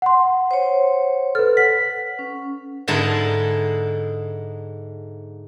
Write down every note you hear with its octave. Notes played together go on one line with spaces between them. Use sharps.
F#5 C6
C5 C#5
A4 B4 F6
F#5 B6
C#4
G#2 D3 G#3 D#4 E4 A5